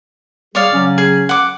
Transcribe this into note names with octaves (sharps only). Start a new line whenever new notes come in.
G3 G#4 C#5 D5 F5
C#3 F#3 C#4
G#4
F#5 D6